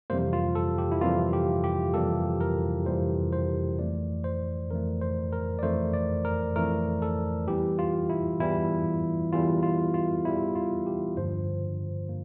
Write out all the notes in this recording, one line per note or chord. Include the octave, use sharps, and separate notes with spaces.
F2 C3 E3 G3 A#3 C5
F4
A4
G4
E4
F2 C3 E3 G3 A#3 F4
G4
G4
F2 C3 E3 G3 A#3 A4
A#4
F2 C3 E3 G3 A#3 C5
C5
F2 E3 A3 D5
C5
F2 E3 A3 A#4
C5
A#4
D5
F2 E3 A3 C5
D5
A#4
F2 E3 A3 A#4
A4
E2 E3 G3 G4
F4
E4
E2 E3 G3 E4
E2 E3 G3 F4
F4
F4
E2 E3 G3 E4
F4
G4
G2 D3 F3 A#3 C5
A#3